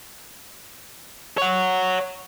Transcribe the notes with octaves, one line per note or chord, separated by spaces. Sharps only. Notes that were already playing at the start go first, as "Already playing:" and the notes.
C#5 F#5